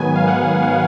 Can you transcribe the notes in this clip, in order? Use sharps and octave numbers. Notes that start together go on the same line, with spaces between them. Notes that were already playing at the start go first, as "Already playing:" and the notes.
Already playing: G#2 D#3 F#3 B3 G#5
F5
F#5
F5